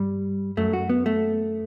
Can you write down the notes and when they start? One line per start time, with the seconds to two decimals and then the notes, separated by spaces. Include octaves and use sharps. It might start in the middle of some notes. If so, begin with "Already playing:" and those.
Already playing: G2 G3
0.57 F#2 A3
0.73 F#4
0.89 B3
1.06 A3